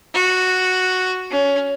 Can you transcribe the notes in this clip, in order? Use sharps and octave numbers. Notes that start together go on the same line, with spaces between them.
F#4
C#4